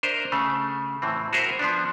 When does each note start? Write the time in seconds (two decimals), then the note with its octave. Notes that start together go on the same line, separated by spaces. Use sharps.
0.03 D4 A#4 C5 D#5 E5
0.32 C#3 A3
1.02 A2 E3 C4
1.33 F#4 G#4 A#4 C5 E5
1.59 F3 B3 D4